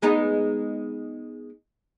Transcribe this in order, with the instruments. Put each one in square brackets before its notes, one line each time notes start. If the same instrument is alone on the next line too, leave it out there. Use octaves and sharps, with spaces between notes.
[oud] G#3 B3 D#4